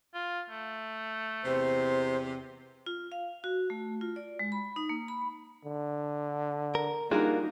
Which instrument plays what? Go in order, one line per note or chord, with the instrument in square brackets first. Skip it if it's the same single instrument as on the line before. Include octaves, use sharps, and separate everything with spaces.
[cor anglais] F4
A3
[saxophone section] E2 C3 [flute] C5
[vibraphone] F4
F5
F#4
A3
F4
D5
G#3
B5
D#4
A#3
B5
[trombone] D3
[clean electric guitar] A#4
[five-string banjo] G3 F4 G#4 [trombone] A#3 [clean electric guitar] D4 F#4 A#4 [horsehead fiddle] D#4